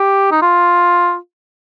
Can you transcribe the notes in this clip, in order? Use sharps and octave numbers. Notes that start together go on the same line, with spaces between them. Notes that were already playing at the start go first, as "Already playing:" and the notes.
Already playing: G4
D#4
F4